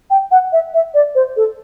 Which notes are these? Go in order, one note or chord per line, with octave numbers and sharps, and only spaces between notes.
G5
F#5
E5
E5
D5
C5
A4